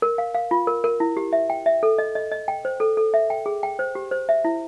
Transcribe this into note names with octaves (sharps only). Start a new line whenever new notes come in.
A#4
F5
F5
F4
A#4
A#4
E4
G4
E5
G5
E5
A4
D#5
D#5
D#5
G5
C5
A4
A4
E5
G5
G#4
G5
C5
G4
C5
E5
E4